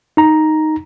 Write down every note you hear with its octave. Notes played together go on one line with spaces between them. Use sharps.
D#4 A#5